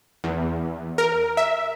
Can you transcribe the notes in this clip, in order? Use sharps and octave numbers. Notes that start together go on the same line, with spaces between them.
E2
A#4
E5